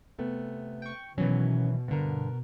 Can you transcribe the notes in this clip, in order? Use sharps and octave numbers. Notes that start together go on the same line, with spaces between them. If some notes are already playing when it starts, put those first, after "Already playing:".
C3 A3 B3
G5 C#6
B2 D#3 E3 F#3 B3 C#4
G2 D3 B3 A#4